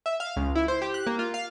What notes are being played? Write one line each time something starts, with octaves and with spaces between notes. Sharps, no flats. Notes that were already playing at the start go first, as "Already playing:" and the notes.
E5
F5
C#2
E4
C5
G4
F#6
A#3
F4
F5